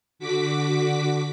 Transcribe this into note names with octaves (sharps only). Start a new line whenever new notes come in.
D3 F#4 D6 B6